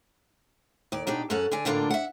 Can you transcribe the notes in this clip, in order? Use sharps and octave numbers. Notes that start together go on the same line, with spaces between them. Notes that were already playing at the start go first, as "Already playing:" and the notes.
D#2 D5
B2 D4 D#4 G4
F#2 C#4 A4 F#5
D3 D5 G#5
A2 D3 A#3 D4 D#4 F4
E5 F#5